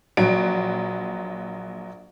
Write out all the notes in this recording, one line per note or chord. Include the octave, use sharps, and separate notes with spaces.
A#1 F#3 D7